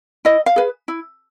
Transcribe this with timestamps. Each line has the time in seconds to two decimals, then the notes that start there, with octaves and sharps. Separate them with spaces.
0.25 E4 D#5
0.46 F5
0.56 G#4 B4
0.88 E4